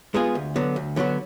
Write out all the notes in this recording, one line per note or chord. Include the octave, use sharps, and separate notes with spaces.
G#3 B3 F4 G#4
D2
D3 F#3 B3 F#4
D2
D3 F#3 B3 F#4